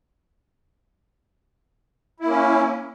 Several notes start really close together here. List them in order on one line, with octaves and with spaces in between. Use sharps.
E4 A#3 C#4